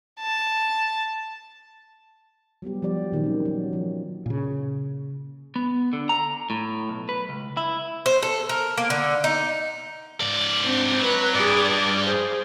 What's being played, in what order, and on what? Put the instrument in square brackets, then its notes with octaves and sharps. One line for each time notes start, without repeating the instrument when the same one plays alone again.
[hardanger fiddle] A5
[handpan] F#3 G3 B3 G4
F3 G3 G4 D5
A#2 D#3 F#3 A#3
C4 C#4
F#3
F3 F4
[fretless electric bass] A#2 C#3
[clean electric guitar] B3
D3
A#5
A2
B1
B4
C#2
E4
[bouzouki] C5
A4
A#4
A#3
D3
D#4
[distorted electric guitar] G#2 D5
[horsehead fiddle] C4 D4
[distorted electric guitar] F#3 [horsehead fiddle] B4
[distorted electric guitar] G2 [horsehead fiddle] G#4 D5
[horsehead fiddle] D5
G#4 C5